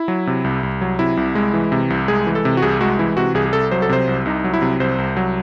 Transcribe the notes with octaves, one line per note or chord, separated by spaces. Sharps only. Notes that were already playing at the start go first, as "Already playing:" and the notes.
Already playing: E4
F#3
C3
C2
C2
F#3
C3 E4
C2
G#3
E3
C3
C2
G#3 G#4
E3
A4
C3
F#4
C2 G#4
G#3 F#4
E3 E4
C3 F#4
C2 G#4
G#4
C2 A4
F#3 C5
A4
C3 C5
C2
C2 D#4
F#3
E4
C3
C2 C5
C2
F#3